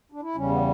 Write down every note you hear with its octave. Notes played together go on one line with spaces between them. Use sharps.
D4
E4
E2 C#3 G3 C#4
B3